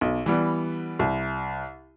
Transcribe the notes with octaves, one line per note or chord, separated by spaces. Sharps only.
B1
E3 G3 B3
C2